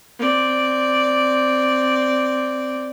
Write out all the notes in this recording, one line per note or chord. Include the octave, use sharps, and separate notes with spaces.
C4 D5